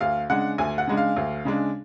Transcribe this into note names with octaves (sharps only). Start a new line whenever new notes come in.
D2 F5
C#3 G#3 D4 F#5
D2 G#5
F#5
C#3 G#3 D4
F5
D2
C#3 G#3 D4